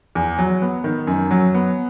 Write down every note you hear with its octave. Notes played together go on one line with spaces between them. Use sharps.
E2
F#3
B3
D#3
F#2
F#3
B3